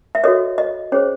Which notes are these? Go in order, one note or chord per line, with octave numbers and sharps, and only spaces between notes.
E5
F#4 A4 C#5 D#5
D#5
C#4 G#4 C5 C#5